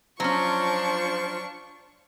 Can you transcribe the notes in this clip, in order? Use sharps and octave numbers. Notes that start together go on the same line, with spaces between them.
F3 F#3 C#4 D4 F4 C5 C#6